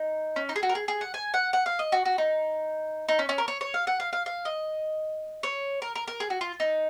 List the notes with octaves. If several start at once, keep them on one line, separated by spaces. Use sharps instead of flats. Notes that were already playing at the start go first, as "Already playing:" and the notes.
Already playing: D#4
C#4
D#4
G#4
F#4
A#4
G#4
G#4
F#5
G#5
F#5
F#5
F5
D#5
F#4
F#4
D#4
D#4
C#4
C#4
A#4
C#5
C#5
F5
F#5
F5
F5
F5
D#5
C#5
A#4
A#4
A#4
G#4
F#4
F4
D#4